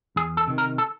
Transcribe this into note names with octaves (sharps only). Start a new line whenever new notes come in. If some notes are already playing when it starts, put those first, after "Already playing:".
E2 G#4
A4
C3 D#3
A#4
A4